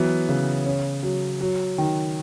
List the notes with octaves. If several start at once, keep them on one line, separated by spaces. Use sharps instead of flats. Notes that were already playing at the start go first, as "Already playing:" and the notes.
Already playing: E3 F#3 B3
C#3
C#4
F#3
F#3
D#3